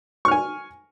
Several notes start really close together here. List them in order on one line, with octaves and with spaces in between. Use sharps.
C#6 F6 G#5